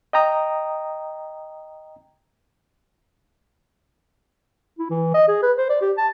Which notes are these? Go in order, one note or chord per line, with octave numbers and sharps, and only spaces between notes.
D#5 G5 A#5 D#6
E4
E3
D#5
G#4
B4
C5
D5
G4
A5